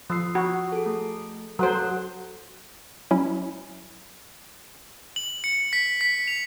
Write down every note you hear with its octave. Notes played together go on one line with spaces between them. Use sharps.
F3 D#6 E6 C7
F#4
G#4 A4
A3
F#3 A4 C5 F#5 F#6
F#3 C#4 E4
F#7
C#7
B6
B6
F7